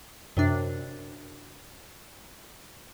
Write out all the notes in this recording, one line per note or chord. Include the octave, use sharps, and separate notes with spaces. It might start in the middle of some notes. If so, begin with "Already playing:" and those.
F#2 C3 D4